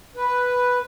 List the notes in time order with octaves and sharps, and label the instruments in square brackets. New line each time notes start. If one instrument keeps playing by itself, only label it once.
[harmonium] B4